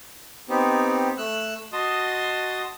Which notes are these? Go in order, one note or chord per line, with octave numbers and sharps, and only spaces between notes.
B3 C4 D#4 G4
A3 E6 F#6
F#4 D#5 A5 C6 D#6